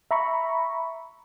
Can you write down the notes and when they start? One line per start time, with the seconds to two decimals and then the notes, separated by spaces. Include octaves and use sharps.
0.11 E5 A#5 B5 C#6